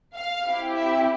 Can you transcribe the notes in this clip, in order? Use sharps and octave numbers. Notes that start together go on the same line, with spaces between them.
F5
C4 E4 G4
E5